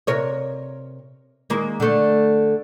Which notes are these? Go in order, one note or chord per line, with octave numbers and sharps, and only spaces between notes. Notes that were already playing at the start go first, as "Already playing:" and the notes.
C3 A#4 C#5
D#3 G#3 A#3
D3 A3